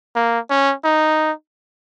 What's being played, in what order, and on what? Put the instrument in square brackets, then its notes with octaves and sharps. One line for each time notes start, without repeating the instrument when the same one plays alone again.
[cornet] A#3
C#4
D#4